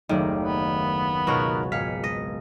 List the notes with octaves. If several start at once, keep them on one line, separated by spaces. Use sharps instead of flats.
F#1 D#2 D#3 A3 D5
B3
C#2 B2 D#4 F#4 A#4 C#5
G#1 G#4 F5 B6 C#7
D#5